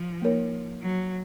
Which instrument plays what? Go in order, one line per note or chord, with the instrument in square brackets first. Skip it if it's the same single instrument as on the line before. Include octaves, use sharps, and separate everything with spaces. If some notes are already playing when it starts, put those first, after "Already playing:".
Already playing: [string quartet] F3
[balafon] A#3 D#4 A#4 C#5
[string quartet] F#3